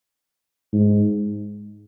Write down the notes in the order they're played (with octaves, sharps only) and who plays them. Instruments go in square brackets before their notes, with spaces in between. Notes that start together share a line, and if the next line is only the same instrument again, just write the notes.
[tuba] G#2